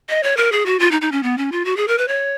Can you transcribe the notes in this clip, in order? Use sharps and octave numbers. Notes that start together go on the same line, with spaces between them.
D#5
C#5
A#4
G#4
F#4
F4
D#4
D#4
C#4
B3
C#4
F4
F#4
G#4
A#4
B4
C#5